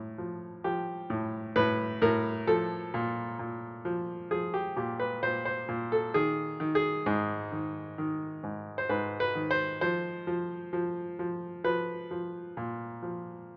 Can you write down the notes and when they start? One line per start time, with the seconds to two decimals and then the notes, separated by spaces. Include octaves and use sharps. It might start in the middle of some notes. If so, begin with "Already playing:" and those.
Already playing: A2
0.18 F3
0.64 F3 G4
1.10 A2
1.56 A2 B4
2.02 A2 A#4
2.47 F3 A4
2.94 A#2
3.39 A#2
3.85 F3
4.31 F3 G#4
4.54 G4
4.77 A#2 G4
5.00 B4
5.23 A#2 C5
5.45 C5
5.69 A#2
5.92 A4
6.14 D#3 G#4
6.60 D#3
6.75 G#4
7.06 G#2
7.52 D#3
7.98 D#3
8.43 G#2
8.78 C5
8.89 G#2 B4
9.20 B4
9.35 D#3
9.51 C5
9.81 F3 C5
10.27 F3
10.73 F3
11.19 F3
11.64 F3 B4
12.11 F3
12.57 A#2
13.02 F3